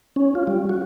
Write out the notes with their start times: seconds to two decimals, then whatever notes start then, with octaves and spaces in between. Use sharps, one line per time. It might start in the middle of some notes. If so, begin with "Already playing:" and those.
0.16 C#4
0.35 F4
0.47 G3
0.69 F#4